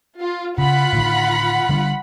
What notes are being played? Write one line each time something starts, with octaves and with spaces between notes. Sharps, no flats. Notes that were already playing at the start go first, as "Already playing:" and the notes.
F4
C#3 F4 F#5 B5
A2 D3 D#3
D3 G3 D4